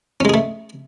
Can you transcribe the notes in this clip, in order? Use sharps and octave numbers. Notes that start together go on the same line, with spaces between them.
G#3 A3 C#4 G#4